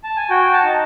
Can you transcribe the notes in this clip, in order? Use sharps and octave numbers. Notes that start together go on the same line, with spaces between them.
A5
G#5
F#4 G5
A5
D#4